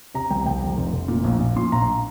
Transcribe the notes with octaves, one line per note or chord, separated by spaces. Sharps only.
C3 A#5
C2 G5
C2 G5
F2
F1
F1
A#2
A#1
A#1
A#2 C6
A#1 A#5